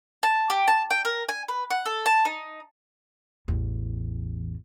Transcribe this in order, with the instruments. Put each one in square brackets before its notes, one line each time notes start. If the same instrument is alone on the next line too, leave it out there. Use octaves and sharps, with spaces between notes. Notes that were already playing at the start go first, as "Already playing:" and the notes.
[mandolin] A5
G4
A5
G5
A#4
G#5
B4
F#5
A4
A5
D#4
[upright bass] A1 E2